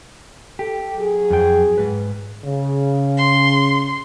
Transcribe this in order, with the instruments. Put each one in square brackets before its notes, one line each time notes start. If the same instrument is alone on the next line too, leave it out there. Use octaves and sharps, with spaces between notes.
[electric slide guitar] G4 [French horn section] A4
[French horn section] F#3 G#4
[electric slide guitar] F2 G5
G#2 B4
[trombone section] C#3
[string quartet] C6